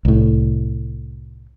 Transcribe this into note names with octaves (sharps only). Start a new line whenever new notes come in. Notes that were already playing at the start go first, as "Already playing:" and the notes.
C2 A2